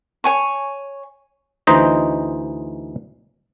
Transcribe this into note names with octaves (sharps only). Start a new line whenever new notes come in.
C#5 G#5 C#6
D2 E3 D#4 C5 D#5